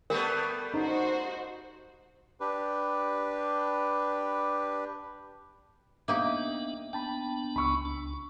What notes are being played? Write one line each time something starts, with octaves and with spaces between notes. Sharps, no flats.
G3 A3 B3 A#4
D#4 F#4 C5
D4 G4 B4
A#3 B3 D4 D#4 G4 E5
B3 D4 G5 A5 B5
C#2 B5 C#6 E6
D4